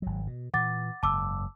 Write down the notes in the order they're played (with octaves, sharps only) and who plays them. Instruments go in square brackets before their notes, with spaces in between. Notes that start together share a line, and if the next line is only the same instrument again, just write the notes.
[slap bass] G#1 F#3
B2
[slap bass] A#2 E3 [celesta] F#5 D6 A6
[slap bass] F#1 G#2 [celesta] A5 D6 E6